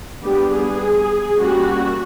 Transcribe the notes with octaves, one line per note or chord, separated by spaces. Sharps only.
G3 B3 D4 G4
G#4
G3 A#3 C#4 F#4